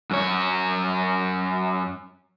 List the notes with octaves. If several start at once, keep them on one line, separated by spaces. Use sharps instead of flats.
F#2 C#5